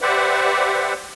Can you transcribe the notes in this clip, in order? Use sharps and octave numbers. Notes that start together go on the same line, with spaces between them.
G4 B4 C5 D5 E5 F#5